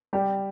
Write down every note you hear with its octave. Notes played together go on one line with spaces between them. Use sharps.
G3 G4